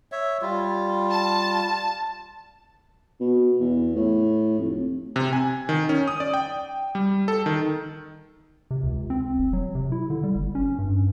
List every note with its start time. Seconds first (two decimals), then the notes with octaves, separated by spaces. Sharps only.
0.12 C#5 E5
0.42 G3 F4
1.11 A5
3.20 B2
3.60 E2
3.96 A2
4.59 F1
5.16 C3
5.33 G#5
5.69 D#3
5.89 C#4
6.08 D#6
6.20 D5
6.34 G5
6.95 G3
7.28 A4
7.46 D#3
8.71 C3
8.83 C#2
9.10 C4
9.38 E1
9.53 F#3
9.75 C3
9.92 E4
10.10 D3
10.23 G3
10.35 G1
10.55 C#4
10.79 G2